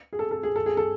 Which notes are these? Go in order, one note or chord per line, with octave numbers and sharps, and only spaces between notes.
G#4
A4
A4
G#4
A4
G#4
A4